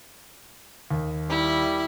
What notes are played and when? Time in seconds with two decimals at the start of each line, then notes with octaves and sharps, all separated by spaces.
0.91 D#2
1.30 G3 E4